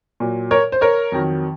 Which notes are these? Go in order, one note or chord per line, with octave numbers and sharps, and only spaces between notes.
A#2 F#3
A#4 C#5
C5
A#4 C#5
F2 D#3 F#3